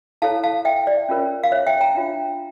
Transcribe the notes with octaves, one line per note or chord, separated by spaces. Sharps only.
E4 A4 C#5 F5 A5
F5 A5
E5 G5
D5
C#4 F4 A#4 C#5
F5
C#5 E5
E5 G5
G5 A#5
D4 F4 C#5